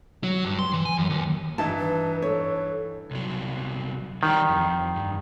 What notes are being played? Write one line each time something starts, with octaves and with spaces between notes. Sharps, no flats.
F#3
G2
C6
E3
G#5
F#2
D#2
G2 E3 D#4 A5
B4
A4 C#5
C2 F#3
D#3 E3 G3
F2
G2